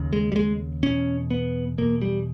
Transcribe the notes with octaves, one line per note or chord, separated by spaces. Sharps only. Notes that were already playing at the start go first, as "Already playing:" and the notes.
Already playing: D#2 C#3
G#3
G3
G#3
E2 B2 C#4
B3
E2 B2 A#3
G3